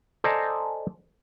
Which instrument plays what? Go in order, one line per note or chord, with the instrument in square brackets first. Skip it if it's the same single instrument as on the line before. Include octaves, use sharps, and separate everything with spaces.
[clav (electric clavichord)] A4 C5 D5 D#5 G#5 A#5